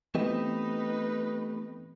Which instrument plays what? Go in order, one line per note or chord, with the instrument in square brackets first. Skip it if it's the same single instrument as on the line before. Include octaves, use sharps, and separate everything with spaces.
[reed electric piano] E3 B3 C4 [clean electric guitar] A3 G4 D#5 [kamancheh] D#4 B4